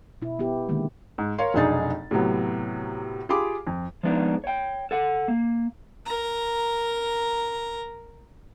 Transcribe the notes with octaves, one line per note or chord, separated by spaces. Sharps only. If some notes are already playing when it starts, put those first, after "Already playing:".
B2 E4
B3 E4 G4
D3 D#3 G#3 A#3
G#2
A#4 C#5 F5 C6
F1 B1 D4 D#4 G#4 A6
A2 C3 F#3 B3
F4 G4 G#4 B5 D6
F2
F3 G#3 B3 D4 D#4
C#5 G5
A4 F#5
A#3
A#4 A#5